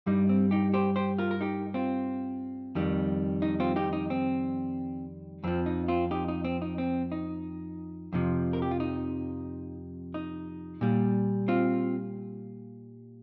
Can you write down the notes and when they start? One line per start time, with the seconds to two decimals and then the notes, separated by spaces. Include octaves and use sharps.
0.06 G2 G3 D#4
0.29 C4
0.51 D#4 G4
0.74 G4 C5
0.96 G4 C5
1.18 F4 A#4
1.31 A#4
1.41 D#4 G4
1.74 C4 F4
2.75 F2 D#3 G3
3.42 D#4
3.60 C4 F4
3.76 D#4 G4
3.93 D#4
4.10 C4
5.44 F2 F3 C4
5.66 D#4
5.88 C4 F4
6.11 D#4 G4
6.28 D#4
6.44 C4
6.62 D#4
6.78 C4
7.12 D#4
8.13 F2 C3 F3
8.53 A#4
8.62 G4
8.71 F4
8.80 D#4
10.14 D#4
10.81 A#2 G3
11.48 C4 F4